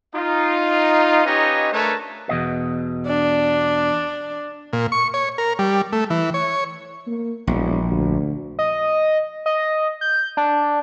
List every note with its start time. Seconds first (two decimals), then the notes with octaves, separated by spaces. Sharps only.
0.14 D#4 F4
1.26 C#4 D#4 G4 B4 C#5 D#5
1.73 A3 D4 A#4 B4 C#5 A5
2.29 E2 B2 D#5
3.07 D4
4.73 A#2
4.92 C#6
5.14 C#5
5.38 A#4
5.59 G3
5.92 A3
6.10 E3
6.34 C#5
7.07 A#3
7.47 E1 A#1
7.91 D2
8.59 D#5
9.46 D#5
10.01 G6
10.37 D4